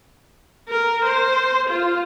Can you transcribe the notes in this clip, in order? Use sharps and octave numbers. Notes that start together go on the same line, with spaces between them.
A#4
C5
F4